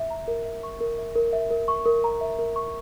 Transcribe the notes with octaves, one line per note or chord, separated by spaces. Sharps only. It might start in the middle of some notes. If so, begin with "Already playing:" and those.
Already playing: E5
A#5
A#4
E5
C#6
A#4
E5
A#4
E5
A#4
C#6
A#4
A#5
E5
A#4
C#6